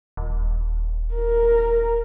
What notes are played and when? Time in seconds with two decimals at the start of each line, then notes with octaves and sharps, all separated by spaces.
0.17 D#1
1.14 A#4